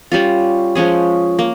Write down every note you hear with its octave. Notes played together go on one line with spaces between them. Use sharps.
G3 C#4 F4
F3 G#3 C#4 G#4
A#3